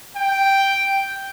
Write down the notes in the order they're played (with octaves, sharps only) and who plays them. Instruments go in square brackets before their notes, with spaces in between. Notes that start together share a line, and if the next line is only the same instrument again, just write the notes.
[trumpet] G5